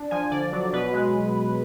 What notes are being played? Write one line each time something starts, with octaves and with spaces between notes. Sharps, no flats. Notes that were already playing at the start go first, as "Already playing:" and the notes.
Already playing: D4
F3 G#5
D3 D5
F#3
B2 B4
G#3